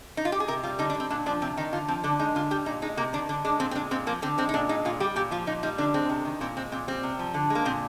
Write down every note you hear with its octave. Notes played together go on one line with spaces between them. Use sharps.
D#4
F4
G4
G#4
C3 A#4
G3 F4
D3 D#4
D4
G3
C4
A#2 D4
F3 D4
C3 C4
D#3 D#4
D3 F4
F3 C4
D3 D4
G#3 D#4
D3 F4
G3 G4
A#2 D#4
G#3 D#4
C3 A#3
D#3 D4
D3 D4
G#3 D4
A#2 C4
C4
G#3 D4
A#2 C4
F3 A#3
D3 C4
G#3 C4
D#4
A#2 D4
G#3 D#4
A#2 F4
G3 G4
A#2 G4
F3 F4
A#2 D#4
G3 D#4
D3 D4
G#3 C4
C3
D#3
A#2 C4
G#3 C4
A#2 C4
G3 C4
C3
F3
D3
G#3
A#3
A#2 C4